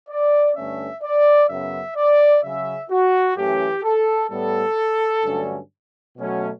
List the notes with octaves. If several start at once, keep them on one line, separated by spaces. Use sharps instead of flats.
D5
G2 D3 A3 C#4 E5
D5
F#2 C#3 F#3 B3 E5
D5
C#3 F#3 C#4 E5
F#4
F#2 E3 A3 C#4 G4
A4
A2 G3 B3 A4
G2 D3 F#3 A3 C#4
B2 F#3 A3 C#4